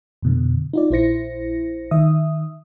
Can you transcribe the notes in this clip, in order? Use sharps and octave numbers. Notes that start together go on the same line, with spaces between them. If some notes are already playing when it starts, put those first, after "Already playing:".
F2 B2 D3
D#4 F4 D5
A#1 E4 C5 A#6 C#7
D#3 E5 D#6